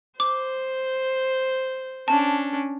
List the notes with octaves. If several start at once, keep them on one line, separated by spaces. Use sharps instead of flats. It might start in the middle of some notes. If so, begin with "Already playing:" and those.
C5 D6
C#4 D4 A5